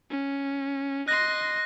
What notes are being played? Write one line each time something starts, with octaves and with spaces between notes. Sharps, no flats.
C#4
D#5 C6 F#6 A#6